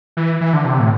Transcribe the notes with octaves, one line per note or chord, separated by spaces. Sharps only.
E3
E3
D3
C3
A2